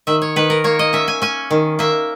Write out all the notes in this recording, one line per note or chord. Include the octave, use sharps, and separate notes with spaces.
D#3 E5
C#5
D#3 B4
A#4
A#3 C#5
D#5
C#4 E5
G#5
C#4 G#5
D#3
A#3 E5